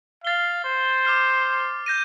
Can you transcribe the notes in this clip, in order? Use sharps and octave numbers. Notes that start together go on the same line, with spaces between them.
F5 A6 C7 G7
C5
D6 F6 C7
G6 A#6 D#7